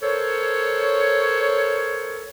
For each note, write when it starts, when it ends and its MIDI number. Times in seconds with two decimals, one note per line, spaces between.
0.02 2.29 69
0.02 2.29 70
0.02 2.29 72
0.02 2.29 73